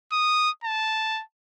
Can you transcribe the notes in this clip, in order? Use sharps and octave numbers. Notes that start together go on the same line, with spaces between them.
D#6
A5